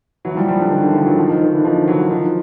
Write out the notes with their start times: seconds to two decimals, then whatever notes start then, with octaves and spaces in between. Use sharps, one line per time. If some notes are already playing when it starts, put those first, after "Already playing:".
0.25 E3 F#3
0.36 F3 G3
0.48 F3 G3
0.60 D3
0.71 D#3
0.83 D3 E3
0.94 D#3 F3
1.06 E3 F#3
1.18 D#3 F3
1.30 D#3
1.41 D#3
1.52 D3 E3
1.64 D#3 F3
1.87 E3 F#3
2.10 D#3 F3